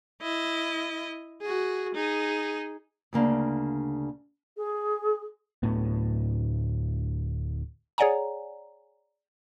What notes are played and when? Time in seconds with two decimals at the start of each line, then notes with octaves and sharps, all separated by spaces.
0.22 E4 D#5
1.42 F#4 G#4
1.95 D#4 G#4
3.13 D2 C#3 A#3 D4
4.57 G#4
5.63 D1 D2 A2 B3
7.98 G#4 C#5 D5 F#5 G#5 A#5